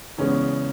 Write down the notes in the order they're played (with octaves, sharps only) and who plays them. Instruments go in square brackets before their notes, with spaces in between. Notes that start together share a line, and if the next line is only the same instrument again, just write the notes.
[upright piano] E2 C#3 G#3 B3 C#4